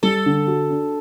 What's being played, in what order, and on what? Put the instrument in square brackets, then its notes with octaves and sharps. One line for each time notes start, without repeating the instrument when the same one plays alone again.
[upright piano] G3 [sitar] A4
[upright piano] D3
F#4
D4